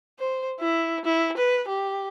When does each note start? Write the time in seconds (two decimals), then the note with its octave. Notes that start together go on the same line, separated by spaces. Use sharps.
0.19 C5
0.60 E4
1.05 E4
1.37 B4
1.68 G4